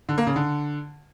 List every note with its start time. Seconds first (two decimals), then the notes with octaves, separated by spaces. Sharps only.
0.09 D3
0.18 A#3
0.27 C#3
0.36 D3